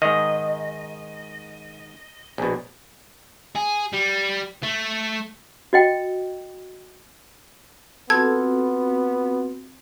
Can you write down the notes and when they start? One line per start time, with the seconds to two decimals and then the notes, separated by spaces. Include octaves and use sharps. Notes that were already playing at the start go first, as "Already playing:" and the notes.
0.02 G#2 D#3 D#5
2.38 A#1 B2
3.55 G#4
3.93 G3
4.63 A3
5.73 F#4 D#5 G5
8.10 B3 C4 F4 F#4 A4 G#6